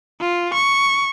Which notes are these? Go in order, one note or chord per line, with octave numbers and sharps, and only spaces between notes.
F4
C#6